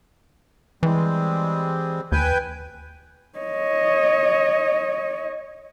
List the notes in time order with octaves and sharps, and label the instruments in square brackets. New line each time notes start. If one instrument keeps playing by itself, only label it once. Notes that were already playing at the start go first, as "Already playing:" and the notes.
[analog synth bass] E3 [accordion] G3 G#3 C4
[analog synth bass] D#2 [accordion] B4 G5 G#5
[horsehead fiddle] C#5 D#5